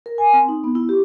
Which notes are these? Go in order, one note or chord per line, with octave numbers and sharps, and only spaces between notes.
A#4
G#5
C4
D#4
B3
E4
G4